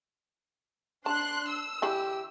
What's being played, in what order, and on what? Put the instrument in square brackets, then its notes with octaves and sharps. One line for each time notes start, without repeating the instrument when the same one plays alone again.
[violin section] D4 C6 F#6 [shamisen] A5
[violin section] E6
[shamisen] D3 E3 B5 [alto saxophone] G4